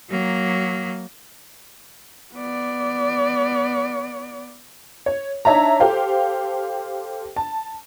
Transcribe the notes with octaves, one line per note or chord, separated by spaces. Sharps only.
F#3 A#3
B3 D5
C#5
D4 D#4 C#5 E5 A5 A#5
G4 A4 C5 F5 G5
A5